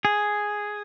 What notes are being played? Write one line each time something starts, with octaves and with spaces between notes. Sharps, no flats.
G#4